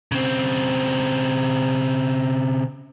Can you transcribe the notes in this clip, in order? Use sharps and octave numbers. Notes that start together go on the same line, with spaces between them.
C#3 C4